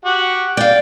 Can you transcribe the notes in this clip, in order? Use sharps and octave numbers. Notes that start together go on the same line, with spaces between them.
F#4 G4 F#5
D5 F5 G5